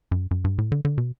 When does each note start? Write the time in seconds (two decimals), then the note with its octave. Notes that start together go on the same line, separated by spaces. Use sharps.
0.11 F#2
0.31 F#2
0.44 G2
0.58 A2
0.72 D3
0.85 D3
0.98 B2